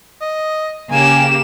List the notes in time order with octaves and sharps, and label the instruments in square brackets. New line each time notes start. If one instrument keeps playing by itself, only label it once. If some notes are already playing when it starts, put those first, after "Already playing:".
[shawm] D#5
[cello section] C#3 G4 [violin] A#3 E7 [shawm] G#5